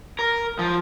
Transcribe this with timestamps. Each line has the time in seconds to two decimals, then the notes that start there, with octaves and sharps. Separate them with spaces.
0.19 A#4
0.59 F3